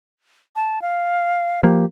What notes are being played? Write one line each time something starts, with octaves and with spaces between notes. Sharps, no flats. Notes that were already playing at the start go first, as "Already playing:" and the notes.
A5
F5
F3 A#3 G4